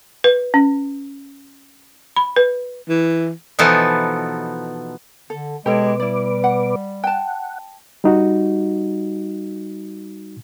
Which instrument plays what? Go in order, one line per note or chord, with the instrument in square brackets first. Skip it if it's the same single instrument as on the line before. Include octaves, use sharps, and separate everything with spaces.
[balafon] B4
C#4
B5
B4
[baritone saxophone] E3
[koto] B2 E3 F3 B3 D#4 A4
[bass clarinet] D3 [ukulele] A4
[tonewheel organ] B2 B4 D6 [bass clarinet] G#3 [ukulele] G4 A4 C#5
[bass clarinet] G3 [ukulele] E4 D5
[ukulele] F#5
[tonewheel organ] F#5 [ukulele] G5 A5
[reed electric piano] G3 D#4 F#4